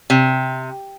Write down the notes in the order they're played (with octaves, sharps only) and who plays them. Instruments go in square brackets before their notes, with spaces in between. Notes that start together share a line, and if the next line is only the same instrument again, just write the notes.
[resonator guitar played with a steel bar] C3